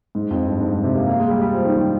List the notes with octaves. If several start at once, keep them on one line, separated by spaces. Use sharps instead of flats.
G#2
F2
G2
G#2
G#2
C3
A#3
A#3
G#3
G3
G3
F3
D#3
D#3